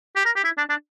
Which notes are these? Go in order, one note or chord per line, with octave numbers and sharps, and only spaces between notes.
G4
A#4
G4
E4
D4
D4